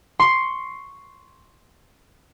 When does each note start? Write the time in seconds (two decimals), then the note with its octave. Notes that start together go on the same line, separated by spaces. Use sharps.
0.20 C6 C#6